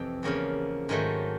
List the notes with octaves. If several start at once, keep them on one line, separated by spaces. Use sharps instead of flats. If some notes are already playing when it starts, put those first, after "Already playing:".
Already playing: F2 C3 E3 G5
E2 C#3 F3 A#3
G#2 D#3 F#3 A3